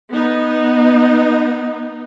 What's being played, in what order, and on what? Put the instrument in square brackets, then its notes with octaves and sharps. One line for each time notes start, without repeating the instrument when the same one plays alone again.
[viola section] B3 D#4